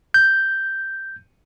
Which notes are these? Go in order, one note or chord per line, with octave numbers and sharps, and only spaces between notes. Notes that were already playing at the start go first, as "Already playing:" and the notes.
G6